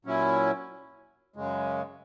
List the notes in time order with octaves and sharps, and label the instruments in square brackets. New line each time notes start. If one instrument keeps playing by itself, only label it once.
[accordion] A#2 F#3 C#4 E4
F#2 C#3 G#3